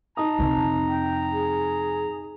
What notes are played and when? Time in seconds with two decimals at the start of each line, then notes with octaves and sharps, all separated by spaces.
0.17 D#4 A5 A#5 D#6
0.39 F2 C3
0.89 G5
1.32 G#4